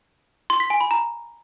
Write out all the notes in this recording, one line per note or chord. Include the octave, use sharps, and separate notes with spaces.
C6
B6
G#5
B5
A#5